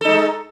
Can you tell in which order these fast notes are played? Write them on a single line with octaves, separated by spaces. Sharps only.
A4 D#4 G#3